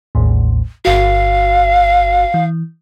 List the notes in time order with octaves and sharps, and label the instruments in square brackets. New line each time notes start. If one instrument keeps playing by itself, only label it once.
[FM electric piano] A1 D#2 A2
[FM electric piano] G1 F#4 [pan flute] F5
[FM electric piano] E3